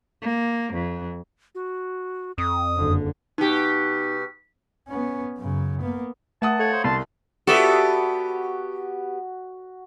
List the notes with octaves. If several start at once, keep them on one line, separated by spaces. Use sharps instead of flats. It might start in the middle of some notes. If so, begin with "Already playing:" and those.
A#3
F2
F#4
F2 D#6
F#1 D3
B2 D#4 G4
B3 C#4
F#2 C#3
A#3 B3
A3 E5 F#5 A5 D#6
A4 C#5 F5
C5
C2 A5 C6
B3 F#4 G4 A4 D5 E5